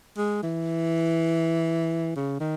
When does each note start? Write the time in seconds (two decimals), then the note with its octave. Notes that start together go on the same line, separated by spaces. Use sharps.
0.17 G#3
0.43 E3
2.16 C#3
2.40 D#3